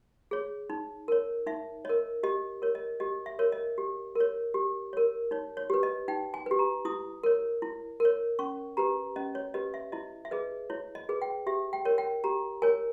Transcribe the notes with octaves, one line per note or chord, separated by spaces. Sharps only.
G#4 C#5
D#4
A#4 C#5
D#4 E5
A#4 C#5 D#5
G4 D#5
A#4 C#5
D#5
G4 D#5
E5
A#4 C#5
D#5
G4
A#4 C#5
G4
A#4 C#5
D#4 C#5
C#5
G4 B4
D#5
D#4 G5
G#5
G4 B4
A#5
E4 D#6
A#4 C#5
E4
A#4
C#5
C#4 C#6
G4 B4 A#5
C#4 D#5
C#5
G4 B4 D#5
E5
E4 D#5
E5
G#4 B4 D#5
E4 C#5
D#5
G#4 B4
G5
G4 E5
G5
A#4 C#5
G5
G4 A#5
A#4 C#5 G#5